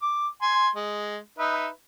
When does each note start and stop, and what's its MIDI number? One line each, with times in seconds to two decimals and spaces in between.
0.02 0.27 86
0.42 0.68 80
0.42 0.68 84
0.76 1.18 56
1.38 1.68 63
1.38 1.68 71
1.38 1.68 76